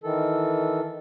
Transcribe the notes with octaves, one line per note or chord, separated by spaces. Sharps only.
D#3 E3 A4